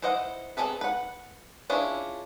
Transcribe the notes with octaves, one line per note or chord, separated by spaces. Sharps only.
E4 B4 C5 D#5 F#5
C4 E4 G#4 A4 B4
B4 F#5
C#4 D4 E4 F4 G#4